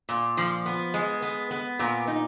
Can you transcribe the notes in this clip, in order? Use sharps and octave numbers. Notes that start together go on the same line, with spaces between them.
A#2
F3
B3
G#3
B3
B3
A#2
D#4